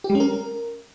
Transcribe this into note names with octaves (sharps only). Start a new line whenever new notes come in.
G4
G#3
C#4
A#4